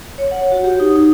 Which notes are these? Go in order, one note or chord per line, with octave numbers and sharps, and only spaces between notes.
C#5
F#5
F#4
G4
D#4
D#4